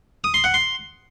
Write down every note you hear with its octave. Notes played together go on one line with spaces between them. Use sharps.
D#6
C6
F#5
C6